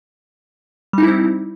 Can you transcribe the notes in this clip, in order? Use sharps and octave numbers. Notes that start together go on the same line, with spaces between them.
G3 C4 D#4 E4